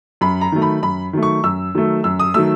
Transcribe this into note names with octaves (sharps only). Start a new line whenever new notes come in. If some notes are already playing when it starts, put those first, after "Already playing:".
F#2 B5
A#5
D#3 F#3 A3
B5
F#2 B5
D#3 F#3 A3
C#6
F#2 E6
D#3 F#3 A3
F#2 E6
D#6
D#3 F#3 A3 E6